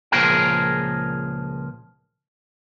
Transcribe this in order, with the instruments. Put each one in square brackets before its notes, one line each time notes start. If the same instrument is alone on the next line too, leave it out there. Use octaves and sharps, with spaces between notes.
[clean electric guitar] C#2 A#2 F3 G#4 A#4 G5